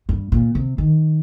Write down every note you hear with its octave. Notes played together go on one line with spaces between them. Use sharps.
G2
A#2
C3
D#3